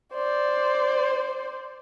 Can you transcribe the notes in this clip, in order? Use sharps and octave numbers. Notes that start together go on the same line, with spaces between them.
C5 D5